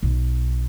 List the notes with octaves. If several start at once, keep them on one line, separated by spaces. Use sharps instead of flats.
B1